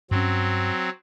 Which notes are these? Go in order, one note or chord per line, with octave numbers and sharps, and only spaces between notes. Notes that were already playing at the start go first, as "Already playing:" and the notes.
G2 F#3 C4 C#4